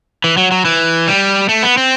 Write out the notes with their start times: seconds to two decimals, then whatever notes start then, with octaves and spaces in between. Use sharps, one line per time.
0.24 E3
0.37 F#3
0.52 F#3
0.65 E3
1.08 G3
1.49 A3
1.63 B3
1.77 C4